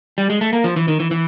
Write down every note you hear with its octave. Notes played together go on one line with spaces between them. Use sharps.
G3
G#3
A3
A#3
F3
E3
D#3
E3
E3